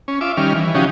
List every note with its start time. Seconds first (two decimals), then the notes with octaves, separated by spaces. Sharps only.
0.08 C#4
0.21 F4 E5 D6
0.37 D#3 G3 C#4 F6
0.55 E3
0.74 C#3 F3 C#4 D#4 F#4 G4